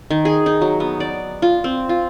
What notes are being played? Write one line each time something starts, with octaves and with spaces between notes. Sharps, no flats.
D#3
G#4
D#4
F#3
B3
D5
F4
C4
F4